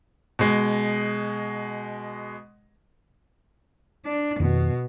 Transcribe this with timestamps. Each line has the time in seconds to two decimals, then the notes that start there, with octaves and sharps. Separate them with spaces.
0.39 B2 G#3
4.06 D4
4.40 F2 B2 D#3